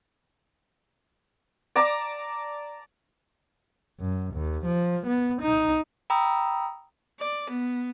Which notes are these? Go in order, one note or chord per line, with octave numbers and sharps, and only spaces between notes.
D5 A5 A#5 D6
F#2
D#2
F3
B3
D#4
G5 A#5 B5 D#6 E6
D5
B3